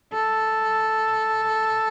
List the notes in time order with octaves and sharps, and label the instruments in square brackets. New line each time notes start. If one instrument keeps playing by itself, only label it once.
[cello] A4